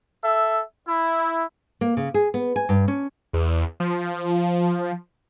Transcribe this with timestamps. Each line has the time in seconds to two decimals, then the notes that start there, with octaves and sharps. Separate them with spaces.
0.23 A4 E5
0.87 E4
1.81 A#3
1.97 C#3
2.14 G#4
2.34 B3
2.56 G#5
2.69 G2
2.88 C#4
3.33 E2
3.80 F3